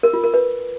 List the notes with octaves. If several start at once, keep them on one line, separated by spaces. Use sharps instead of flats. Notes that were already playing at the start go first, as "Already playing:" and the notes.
A#4
F4
A#4
B4